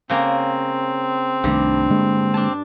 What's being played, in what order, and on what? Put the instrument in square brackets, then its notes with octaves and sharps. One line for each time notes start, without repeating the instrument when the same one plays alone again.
[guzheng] C#3 A#3 A#5 [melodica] C4
[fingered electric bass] C2 D#3 A3 [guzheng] G2
[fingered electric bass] D3 G#3 A#3
[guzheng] D4 A5